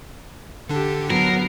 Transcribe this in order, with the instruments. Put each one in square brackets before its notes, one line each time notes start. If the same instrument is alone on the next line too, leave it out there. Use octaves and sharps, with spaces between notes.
[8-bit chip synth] D3 D4 [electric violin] G4 A4
[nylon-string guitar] F#3 [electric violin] B3 C7 [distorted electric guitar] A#4